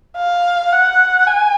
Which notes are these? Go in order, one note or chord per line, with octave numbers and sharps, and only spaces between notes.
F5
F#5
G#5